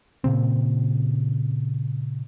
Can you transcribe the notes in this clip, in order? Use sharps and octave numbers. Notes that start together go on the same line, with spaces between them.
A#2 C#3 C4